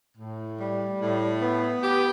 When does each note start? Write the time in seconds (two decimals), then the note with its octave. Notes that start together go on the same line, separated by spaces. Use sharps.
0.17 A2
0.60 G3
1.01 A2
1.42 B3
1.83 G4